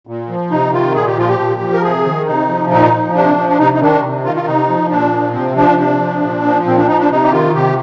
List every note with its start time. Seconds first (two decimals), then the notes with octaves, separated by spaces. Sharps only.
0.07 A#2
0.29 F3
0.51 C3 D#4
0.73 D#3 F4
0.95 A#2 G#4
1.06 G4
1.18 F3 F4
1.28 G4
1.39 A#2
1.61 F3
1.73 A#4
1.83 C3 G#4
2.05 D#3
2.27 C3 D#4
2.48 F3
2.71 A#2 D#4
2.94 F3
3.15 C3 D4
3.37 F3
3.49 D4
3.59 C3 D#4
3.74 D#4
3.81 D#3 D4
4.03 C3
4.24 D#3 F4
4.36 F4
4.46 C3 D#4
4.69 F3
4.90 A#2 D4
5.12 F3
5.34 C3 C4
5.56 F3 D4
5.78 C3 D4
6.00 F3
6.23 A#2
6.44 F3
6.66 A#2 C4
6.77 D4
6.88 F3 D#4
6.99 D4
7.10 C3 D#4
7.23 G4
7.32 D#3 F4
7.54 C3 G4